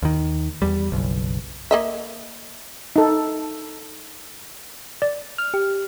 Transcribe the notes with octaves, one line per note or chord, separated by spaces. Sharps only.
D#2 D#3
E2 G3
F#1 B1
A#3 D#5 E5
D#4 A4
D5
F6
G4